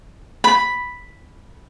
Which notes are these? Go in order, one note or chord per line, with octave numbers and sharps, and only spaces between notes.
B5